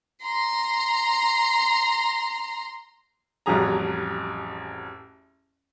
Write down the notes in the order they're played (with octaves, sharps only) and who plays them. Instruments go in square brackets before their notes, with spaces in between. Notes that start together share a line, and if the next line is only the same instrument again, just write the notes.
[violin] A#5 C6
[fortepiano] A1 F2 F#3 G3 G#4 A#5